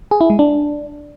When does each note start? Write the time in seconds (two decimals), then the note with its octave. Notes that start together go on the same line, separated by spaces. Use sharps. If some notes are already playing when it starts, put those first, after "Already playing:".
0.11 G#4
0.21 E4
0.30 G#3
0.39 D4